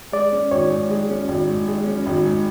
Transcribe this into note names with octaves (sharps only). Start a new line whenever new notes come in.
G#3 D5
C#4
G#1 C#5
G#2
G#3
C#4
G#1
G#2
G#3
C#4
G#1
G#2